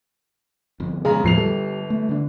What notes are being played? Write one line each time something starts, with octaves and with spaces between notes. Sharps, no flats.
G1 F2
C#3 G#3 G#4 A#5
G1 E2 A2 F3 C7 F7
G3 A4
A3
D3 D4